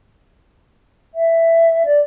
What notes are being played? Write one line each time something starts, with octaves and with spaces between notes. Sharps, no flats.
E5
D5